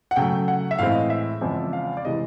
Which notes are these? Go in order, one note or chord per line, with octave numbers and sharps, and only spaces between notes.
F#5
C#3 F#3 A3 G5
F#5
E5
A2 E3 G#3 C4 F5
D#5
E5
E2 C#3 F3 G#3 C4
F5
D5
C3 E3 G#3 D#5